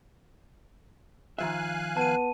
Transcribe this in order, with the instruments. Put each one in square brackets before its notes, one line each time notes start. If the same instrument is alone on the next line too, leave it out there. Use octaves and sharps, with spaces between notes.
[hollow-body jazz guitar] D#3 F3 E5 [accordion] F5 G#5 F#6
[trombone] B3 [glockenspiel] A5 D#7